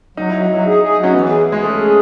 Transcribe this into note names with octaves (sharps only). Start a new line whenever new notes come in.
F#3 D#4
F#3 E4
D#4
F#3 E4
D#4 G#4
G#4
F#3
C#4
E3 B3
G#4
G#4
G#3
A3 C#4
G#4